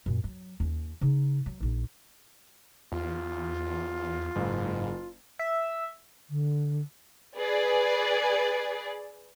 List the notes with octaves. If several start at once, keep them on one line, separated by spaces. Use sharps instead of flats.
F#2 A#2
F#3
D#2 C#4
C#3 D#4
F#3
A#1 D#4
E2 F4
F#1 G#2
E5
D3
G#4 B4 D5